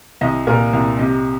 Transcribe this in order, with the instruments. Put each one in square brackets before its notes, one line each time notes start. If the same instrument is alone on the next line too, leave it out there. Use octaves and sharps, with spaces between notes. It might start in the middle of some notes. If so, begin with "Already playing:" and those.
[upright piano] C2 D#5
A#2 A#4
C2
C3 D#5